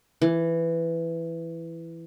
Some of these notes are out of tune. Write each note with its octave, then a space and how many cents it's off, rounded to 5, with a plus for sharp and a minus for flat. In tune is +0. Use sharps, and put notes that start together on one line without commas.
E3 +10